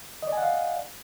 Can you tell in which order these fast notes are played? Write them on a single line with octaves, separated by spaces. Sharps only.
D#5 D5 G#5 F#5 F5